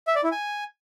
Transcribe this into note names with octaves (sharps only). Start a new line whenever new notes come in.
E5
D5
E4
G#5